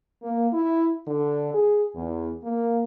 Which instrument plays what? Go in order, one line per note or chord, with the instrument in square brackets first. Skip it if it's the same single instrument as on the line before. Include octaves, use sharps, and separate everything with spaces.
[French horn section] A#3
E4
D3
G#4
E2
A#3